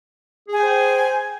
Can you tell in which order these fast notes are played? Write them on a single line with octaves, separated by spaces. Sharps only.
G#4 G#5 G5 C5